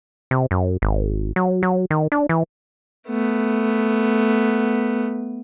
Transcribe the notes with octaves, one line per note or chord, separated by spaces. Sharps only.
C3
F#2
G#1
F#3
F#3
D#3
D4
E3
A3 B3